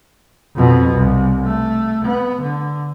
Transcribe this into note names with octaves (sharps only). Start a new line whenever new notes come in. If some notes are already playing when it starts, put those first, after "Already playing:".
F2 B2
C2
A3
B3
D3